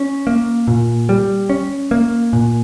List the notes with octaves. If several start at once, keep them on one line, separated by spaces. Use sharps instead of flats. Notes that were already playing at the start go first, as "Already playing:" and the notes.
Already playing: C#4
A#3
A#2
G3
C#4
A#3
A#2